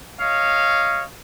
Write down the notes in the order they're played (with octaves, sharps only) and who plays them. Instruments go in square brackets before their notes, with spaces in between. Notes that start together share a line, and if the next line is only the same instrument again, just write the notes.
[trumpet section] C#5 D#5 F5